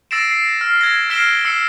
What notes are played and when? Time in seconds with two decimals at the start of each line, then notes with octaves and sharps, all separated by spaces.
0.11 E6 A6 A#6 C7 D7 E7
0.31 C7
0.61 F6
0.81 G#6 A#6
1.10 F6 B6 C7 D7 E7 G7
1.45 E6 C7 C#7